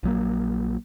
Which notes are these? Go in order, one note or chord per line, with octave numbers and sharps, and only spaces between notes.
A#1 F#3 A#3